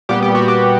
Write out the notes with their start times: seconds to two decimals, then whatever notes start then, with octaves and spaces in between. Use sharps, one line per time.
0.09 A#2 G3 B3 G4
0.23 G4
0.35 F#4
0.48 G4